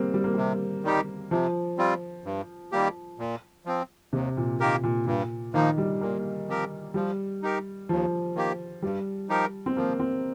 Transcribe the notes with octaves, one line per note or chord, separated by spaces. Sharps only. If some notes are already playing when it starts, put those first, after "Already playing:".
Already playing: G3 A#3 C4
G3
A#3
C3 G3
D#3 G3 D#4 G4
C3 F3
G3 C4 F4
G2
D#3 G3 A#3 G4
A#2
F3 C4
D#2 C3
A#2
D#3 A#3 G4 A#4
A#2
G2 A#2
D#3 F3 A#3 D#4
G3
A#2 A#3
F3 C4 G4 A#4
F3 G3
D#4 G4 A#4
D#2 F3
D#3 A#3 G4
G2 G3
F3 D#4 G4 A#4
C4
F3 A#3
C4